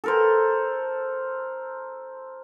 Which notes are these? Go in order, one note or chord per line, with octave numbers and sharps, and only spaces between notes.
A4 A#4 C5